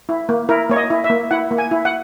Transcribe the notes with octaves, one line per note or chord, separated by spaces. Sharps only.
E4
A#3
E4 A#4
A#3 C#5
D#5
E4
E5
A#3
E4 F#5
A#3
G#5
E4
F#5